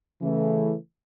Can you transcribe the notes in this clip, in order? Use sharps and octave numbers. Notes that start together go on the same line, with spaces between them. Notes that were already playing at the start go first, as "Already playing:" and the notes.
C#3 E3 A3